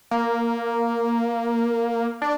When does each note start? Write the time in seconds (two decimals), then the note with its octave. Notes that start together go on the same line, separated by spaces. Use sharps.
0.11 A#3
2.22 D4